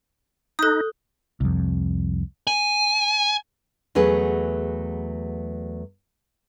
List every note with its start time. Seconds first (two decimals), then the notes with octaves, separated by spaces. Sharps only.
0.59 D#4 A4 D#6 F#6 G6
1.40 C2 F2
2.47 G#5
3.95 E2 F#3 A3 G#4 B4